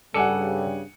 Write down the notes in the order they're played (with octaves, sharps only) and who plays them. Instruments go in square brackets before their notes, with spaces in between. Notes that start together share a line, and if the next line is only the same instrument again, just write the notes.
[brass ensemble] G2 C#3 G3 [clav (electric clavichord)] A4 D5 [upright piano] F#5 G#5 C#7